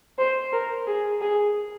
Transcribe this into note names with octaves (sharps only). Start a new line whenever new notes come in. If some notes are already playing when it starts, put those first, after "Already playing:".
C5
A#4
G#4
G#4